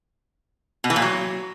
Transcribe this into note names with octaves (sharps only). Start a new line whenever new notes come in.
B2
E3
A#2
F#3